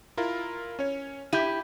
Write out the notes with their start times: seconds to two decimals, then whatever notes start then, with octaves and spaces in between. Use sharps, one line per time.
0.17 E4 F4 A#4
0.79 C#4 C#5
1.33 E4 G4 G6 D#7